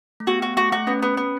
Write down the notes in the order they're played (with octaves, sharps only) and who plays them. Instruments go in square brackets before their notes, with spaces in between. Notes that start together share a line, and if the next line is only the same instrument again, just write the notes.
[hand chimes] A3
[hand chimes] B3 [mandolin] F#4
[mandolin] F#4
[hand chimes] A3 [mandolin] F#4
[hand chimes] A3 [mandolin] F#4
[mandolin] B3 [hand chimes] C#4
[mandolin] B3
B3